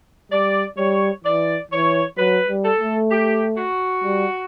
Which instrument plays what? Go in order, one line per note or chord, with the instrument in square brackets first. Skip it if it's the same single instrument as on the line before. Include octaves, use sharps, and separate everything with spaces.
[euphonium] G3 [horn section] D5
[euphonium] G3 [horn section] C#5
[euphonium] E3 [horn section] D5
[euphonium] E3 [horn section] C#5
[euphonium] F#3 [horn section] B4
[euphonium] G3
[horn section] A4
[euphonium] A3
[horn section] G4
F#4
[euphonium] G3